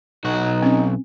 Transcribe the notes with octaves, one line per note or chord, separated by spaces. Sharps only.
B1 D#4 F#4
C4 C#4